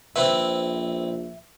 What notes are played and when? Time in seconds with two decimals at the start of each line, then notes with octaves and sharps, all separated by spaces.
0.16 A#1 C4 E4 B4 E5